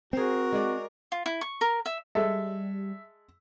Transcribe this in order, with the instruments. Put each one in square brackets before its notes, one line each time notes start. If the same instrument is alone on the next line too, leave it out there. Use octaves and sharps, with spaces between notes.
[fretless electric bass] C4 [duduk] F#4 [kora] G#4 C5 [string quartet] A#4
[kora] G#3 D5
[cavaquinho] F4
E4
C#6
A#4
E5
[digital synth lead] G3 [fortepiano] G#3 A4 [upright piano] E5